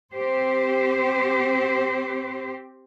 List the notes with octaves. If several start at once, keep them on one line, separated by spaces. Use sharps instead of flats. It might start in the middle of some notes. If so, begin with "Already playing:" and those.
C4 G4 C5